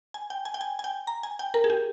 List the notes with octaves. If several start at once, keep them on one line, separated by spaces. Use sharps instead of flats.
G#5
G5
G#5
G5
G#5
G#5
G5
A#5
G#5
G5
A#4
G#4
G4